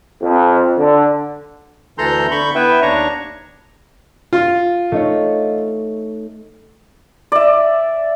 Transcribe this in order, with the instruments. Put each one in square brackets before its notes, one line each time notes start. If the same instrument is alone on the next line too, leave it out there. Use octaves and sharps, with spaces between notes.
[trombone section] F2
D3
[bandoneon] D2 E3 A4 A#5 C6 G6
D3 B5 C#6 G6
B3 E4 B4 E5 G5
D#2 D4 C#5 A#5 C#6
[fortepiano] F4
[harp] A3 D#4 C#5
[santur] D5 E5